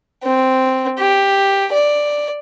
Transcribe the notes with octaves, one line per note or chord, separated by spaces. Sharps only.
C4
G4
D5